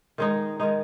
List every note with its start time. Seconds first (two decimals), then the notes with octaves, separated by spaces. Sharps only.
0.18 D#3 G#3 D#4
0.60 D#3 G#3 D#4